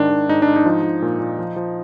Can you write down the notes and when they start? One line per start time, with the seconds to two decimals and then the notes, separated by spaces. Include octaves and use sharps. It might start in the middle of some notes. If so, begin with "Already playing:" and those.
Already playing: G#2 D#3 D4
0.10 D#3
0.29 G#2 D#4
0.42 G#2 D4
0.56 D#4
0.65 F3
0.83 F3
1.02 A#2
1.20 A#2
1.39 F3
1.56 F3